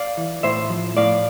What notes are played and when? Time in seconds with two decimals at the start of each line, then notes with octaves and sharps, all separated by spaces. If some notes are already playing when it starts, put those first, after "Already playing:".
Already playing: D5 F5
0.17 E3
0.43 A2 C5 E5
0.70 F3
0.97 A2 D5 F5